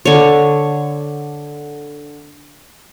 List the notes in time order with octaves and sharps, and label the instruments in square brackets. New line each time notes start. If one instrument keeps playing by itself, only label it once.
[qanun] D3 C#5